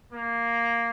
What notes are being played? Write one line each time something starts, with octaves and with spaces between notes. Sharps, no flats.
A#3